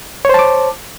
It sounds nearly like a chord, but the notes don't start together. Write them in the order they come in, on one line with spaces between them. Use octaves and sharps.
C#5 C5 A5 D6